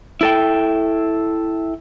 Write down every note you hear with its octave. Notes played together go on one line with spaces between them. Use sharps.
E4 A4 G5